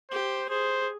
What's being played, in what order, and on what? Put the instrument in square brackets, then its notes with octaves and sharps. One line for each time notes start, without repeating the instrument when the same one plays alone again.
[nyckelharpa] G4 [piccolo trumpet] C5
[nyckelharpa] G#4 [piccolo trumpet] C5